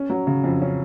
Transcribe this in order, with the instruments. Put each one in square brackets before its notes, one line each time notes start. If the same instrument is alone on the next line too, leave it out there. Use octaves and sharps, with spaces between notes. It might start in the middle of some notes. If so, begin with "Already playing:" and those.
Already playing: [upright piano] C#4
F#3
C#3
F2
C#4